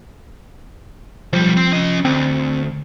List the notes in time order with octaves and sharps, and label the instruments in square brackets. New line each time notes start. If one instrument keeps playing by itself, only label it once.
[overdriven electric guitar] B1 G3 [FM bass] F3
[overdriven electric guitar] C4 C5
C#4 D#5
[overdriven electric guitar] D2 [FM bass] C4